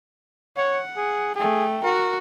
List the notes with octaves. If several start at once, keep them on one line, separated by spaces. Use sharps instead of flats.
C#5 F#5
G#4
A3 G#4 G5
F#4 A#4